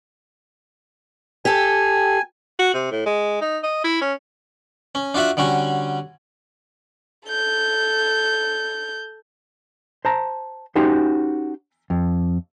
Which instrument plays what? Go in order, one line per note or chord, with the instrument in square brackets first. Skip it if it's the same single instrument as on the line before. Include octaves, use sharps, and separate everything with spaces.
[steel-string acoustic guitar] G4 A4 [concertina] G#5
[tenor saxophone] F#4
C3
A2
G#3
D#4
D#5
E4
C#4
[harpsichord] C#4
D4 F4 F#4 E5 F#5
D3 G3 C#4 F#4
[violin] A4 G6
[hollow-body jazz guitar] C5 A5 A#5
C#4 D#4 F#4 G4 C5
F2